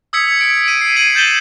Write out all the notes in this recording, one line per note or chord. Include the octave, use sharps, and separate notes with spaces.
D#6 E6 G#6 B6 C#7
B6 D7
D7 D#7
C7 D7
G#6 B6 C7 D#7 F#7
G6 A6 E7 F#7 G7